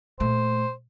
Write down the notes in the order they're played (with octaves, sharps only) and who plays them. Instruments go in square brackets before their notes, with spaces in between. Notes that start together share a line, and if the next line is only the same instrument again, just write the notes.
[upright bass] A#2 A3 [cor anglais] C5